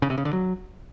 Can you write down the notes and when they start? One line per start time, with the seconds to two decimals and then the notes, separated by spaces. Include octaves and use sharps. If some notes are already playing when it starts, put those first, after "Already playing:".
0.02 C#3
0.10 C3
0.18 C#3
0.25 D3
0.33 F#3